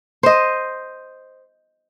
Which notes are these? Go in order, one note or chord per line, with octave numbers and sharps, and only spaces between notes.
C5 D#5